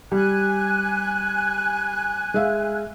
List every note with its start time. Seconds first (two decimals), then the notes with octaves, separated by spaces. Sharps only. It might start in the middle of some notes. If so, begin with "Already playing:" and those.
0.12 G3 G#5 F#6
2.34 G#3 E5 F5